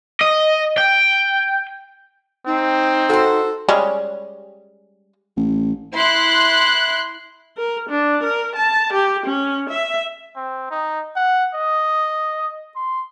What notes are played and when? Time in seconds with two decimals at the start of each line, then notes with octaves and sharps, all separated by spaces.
0.21 D#5
0.78 G5
2.46 C4 D#4
3.10 F#4 A4 C5
3.69 G3 G#3 C#4
5.37 A1
5.94 E4 C6 F#6
7.57 A#4
7.89 D4
8.23 A#4
8.56 A5
8.93 G4
9.26 C#4
9.70 E5
10.36 C4
10.70 D#4
11.16 F#5
11.54 D#5
12.75 C6